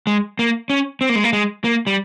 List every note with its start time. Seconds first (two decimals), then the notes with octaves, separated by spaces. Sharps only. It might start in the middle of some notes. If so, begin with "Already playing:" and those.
0.07 G#3
0.39 A#3
0.70 C#4
1.01 C4
1.09 A#3
1.15 G#3
1.24 A#3
1.33 G#3
1.64 A#3
1.87 G3